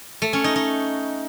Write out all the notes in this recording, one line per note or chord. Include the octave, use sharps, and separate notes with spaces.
A3
C#4
D#4
D#4